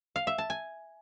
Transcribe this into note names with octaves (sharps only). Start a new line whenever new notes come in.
F5
E5
A5
G#5